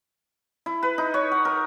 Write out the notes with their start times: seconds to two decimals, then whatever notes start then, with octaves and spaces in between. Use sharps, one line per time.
0.66 E4
0.83 B4
0.98 D#4
1.14 C#5
1.32 F#5
1.45 A#4